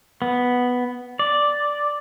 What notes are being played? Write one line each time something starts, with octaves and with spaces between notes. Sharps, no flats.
B3
D5